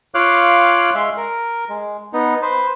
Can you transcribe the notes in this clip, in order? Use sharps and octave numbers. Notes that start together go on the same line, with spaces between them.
F4 C#5 F5 D6 F#6
G#3 E5 F5 C6
A#4
G#3
B3 D#4
B4 C5